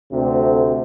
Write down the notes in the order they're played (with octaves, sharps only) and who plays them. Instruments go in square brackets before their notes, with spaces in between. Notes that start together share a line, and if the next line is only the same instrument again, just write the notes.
[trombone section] D2 C3